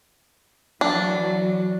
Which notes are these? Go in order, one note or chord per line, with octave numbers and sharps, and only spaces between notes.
E3 F#3 D4